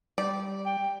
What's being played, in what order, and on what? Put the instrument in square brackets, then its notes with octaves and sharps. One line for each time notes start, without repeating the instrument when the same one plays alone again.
[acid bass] G3 [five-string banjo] D5
[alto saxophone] G5